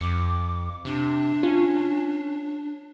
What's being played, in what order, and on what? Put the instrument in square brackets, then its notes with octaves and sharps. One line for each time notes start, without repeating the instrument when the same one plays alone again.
[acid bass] F2 [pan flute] D6 [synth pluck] C#7
[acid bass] C3 [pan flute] D4
[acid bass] C#4 [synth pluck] F4